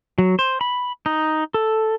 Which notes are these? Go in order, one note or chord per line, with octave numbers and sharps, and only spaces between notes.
F#3
C5
B5
D#4
A4